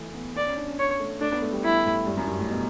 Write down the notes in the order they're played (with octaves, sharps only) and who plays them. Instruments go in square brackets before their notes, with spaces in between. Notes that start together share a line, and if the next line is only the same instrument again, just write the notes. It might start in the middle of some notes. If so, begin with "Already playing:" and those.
Already playing: [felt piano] E3 A3
B3
[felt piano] B3 [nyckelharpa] D5
[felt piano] C#4
D4
C#4
[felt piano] C#4 [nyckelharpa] C#5
[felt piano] A3
[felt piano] A3 [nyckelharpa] D4
[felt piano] B3
A3
G3
[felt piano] G3 [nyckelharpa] E4
[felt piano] A2
G2
F#2
G2
A2
B2